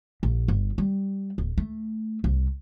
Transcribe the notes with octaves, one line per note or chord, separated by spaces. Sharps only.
A#1
G1
G3
D1
A3
C2